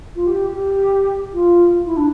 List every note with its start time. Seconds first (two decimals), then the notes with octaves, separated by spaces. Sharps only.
0.15 F4
0.26 G4
0.52 G4
1.33 F4
1.86 E4
1.97 D4